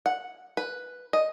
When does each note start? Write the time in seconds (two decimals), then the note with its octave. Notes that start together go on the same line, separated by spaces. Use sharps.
0.06 F#5
0.57 B4
1.13 D#5